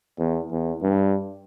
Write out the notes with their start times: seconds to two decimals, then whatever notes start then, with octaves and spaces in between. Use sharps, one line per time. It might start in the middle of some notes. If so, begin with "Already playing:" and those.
0.19 E2
0.51 E2
0.83 G2